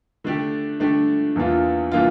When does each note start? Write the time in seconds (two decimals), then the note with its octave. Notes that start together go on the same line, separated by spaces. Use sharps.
0.24 D3 A3 D4 G4
0.80 D3 A3 D4 G4
1.36 E2 E3 A#3 D4 F4
1.92 E3 A#3 D4 F4